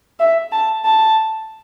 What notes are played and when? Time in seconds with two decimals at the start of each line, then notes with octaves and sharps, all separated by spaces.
0.19 E5
0.52 A5
0.85 A5